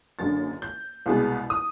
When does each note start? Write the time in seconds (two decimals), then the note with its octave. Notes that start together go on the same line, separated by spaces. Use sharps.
0.19 F#1 F#2 D3 A6
0.62 G6
1.06 C2 B2 G#3 B3
1.50 D#6